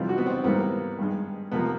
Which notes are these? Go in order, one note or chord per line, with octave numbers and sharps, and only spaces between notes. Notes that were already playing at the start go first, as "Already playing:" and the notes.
Already playing: F2 C3 E3 G3 F4
F#4
B3
C4
G#2 E3 G3 A#3 B3
G2 D#3 G#3
C3 F3 A#3 B3